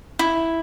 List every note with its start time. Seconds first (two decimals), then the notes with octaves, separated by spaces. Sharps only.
0.19 E4